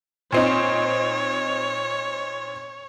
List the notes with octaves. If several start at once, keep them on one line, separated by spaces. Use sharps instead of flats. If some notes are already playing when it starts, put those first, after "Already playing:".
A#2 C4 D#4 C#5